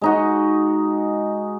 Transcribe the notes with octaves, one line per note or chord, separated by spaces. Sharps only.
G#3 D#4 F#4